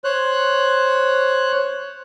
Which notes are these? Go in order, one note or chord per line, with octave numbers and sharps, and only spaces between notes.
C5 C#5 F#6